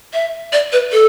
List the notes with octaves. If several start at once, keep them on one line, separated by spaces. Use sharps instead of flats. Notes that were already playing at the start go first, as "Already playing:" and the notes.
E5
D5
B4
A4